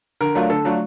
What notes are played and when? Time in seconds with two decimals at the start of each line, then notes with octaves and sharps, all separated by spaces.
0.21 D3 A#4
0.35 F#3 A3 D4 F4
0.50 D3 A4
0.65 F#3 A3 D4 F4